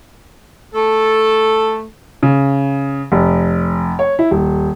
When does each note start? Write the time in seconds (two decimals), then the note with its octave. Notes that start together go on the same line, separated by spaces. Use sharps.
0.74 A3 A4
2.23 C#3
3.12 F1
3.99 C#5
4.19 E4
4.31 D#1